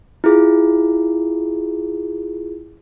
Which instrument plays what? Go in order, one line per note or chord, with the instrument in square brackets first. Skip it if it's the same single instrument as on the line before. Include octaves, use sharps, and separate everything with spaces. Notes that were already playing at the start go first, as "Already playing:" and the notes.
[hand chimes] E4 F4 G#4